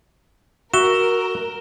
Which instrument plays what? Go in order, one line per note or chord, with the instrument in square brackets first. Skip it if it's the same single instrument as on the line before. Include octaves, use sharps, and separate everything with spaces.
[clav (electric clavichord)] F#4 E5 [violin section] A#4 [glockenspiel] E7 G7